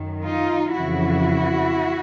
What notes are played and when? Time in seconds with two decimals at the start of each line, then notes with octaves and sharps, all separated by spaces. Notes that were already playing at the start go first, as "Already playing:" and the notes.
Already playing: F#2 D#3
0.24 D#4 F4
0.76 F2 C#3 E3 E4 F#4